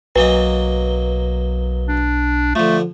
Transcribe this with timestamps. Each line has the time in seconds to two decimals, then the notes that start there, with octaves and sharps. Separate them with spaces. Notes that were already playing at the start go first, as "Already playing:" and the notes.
0.16 B1 F#3 A#3 B4 D#5 G7
1.88 D4
2.55 D3 F3 A3